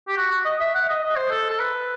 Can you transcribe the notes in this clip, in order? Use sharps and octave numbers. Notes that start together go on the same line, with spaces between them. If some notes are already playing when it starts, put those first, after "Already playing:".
G4
F#4
F#4
D#5
E5
F#5
D#5
D#5
C5
A4
A4
B4